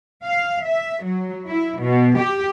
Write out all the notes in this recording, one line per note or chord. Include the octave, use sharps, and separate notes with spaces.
F5
E5
F#3
E4
B2
G4